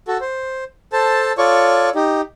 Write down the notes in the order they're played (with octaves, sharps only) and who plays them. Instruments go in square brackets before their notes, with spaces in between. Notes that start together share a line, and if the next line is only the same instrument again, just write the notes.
[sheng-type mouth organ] F#4 A4
C5
A4 C5 A5
F4 A4 C#5 D5 C#6
D#4 G4